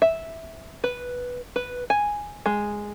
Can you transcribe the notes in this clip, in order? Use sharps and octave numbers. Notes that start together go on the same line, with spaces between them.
E5
B4
B4
G#5
G#3